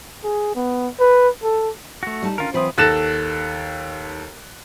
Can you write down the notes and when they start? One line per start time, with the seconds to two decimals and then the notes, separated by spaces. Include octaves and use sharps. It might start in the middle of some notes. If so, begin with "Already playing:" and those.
0.24 G#4
0.55 B3
1.00 B4
1.43 A4
2.03 A3 F#4
2.22 G3 D#4 A5
2.38 D3 D#3 C#4 F4 A#4
2.54 E3 F#3 C4 F4 C5 B5 D#6
2.78 D#2 A4 F#6 A6 A#6 E7